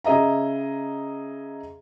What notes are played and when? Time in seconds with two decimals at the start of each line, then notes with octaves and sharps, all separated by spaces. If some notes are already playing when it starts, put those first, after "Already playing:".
0.04 C#3 G#4 D#5 E5 A#5